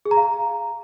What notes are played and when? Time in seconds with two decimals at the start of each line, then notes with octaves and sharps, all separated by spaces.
0.05 G#4
0.11 A#5
0.17 F5